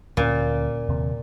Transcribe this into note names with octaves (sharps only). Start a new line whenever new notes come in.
D2 A#2 C#4
D#2 C3